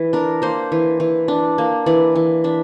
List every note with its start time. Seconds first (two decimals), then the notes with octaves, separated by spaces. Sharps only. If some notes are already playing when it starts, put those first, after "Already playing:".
Already playing: E3
0.13 D4 A#4
0.42 A#3 C5
0.72 E3
1.00 E3
1.28 D4
1.58 A#3
1.86 E3 D5
2.16 E3
2.44 D4 E5